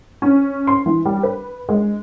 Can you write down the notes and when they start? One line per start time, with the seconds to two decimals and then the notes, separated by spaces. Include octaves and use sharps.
0.22 C#4
0.67 C6
0.86 E3
1.05 G3
1.23 B4
1.69 G#3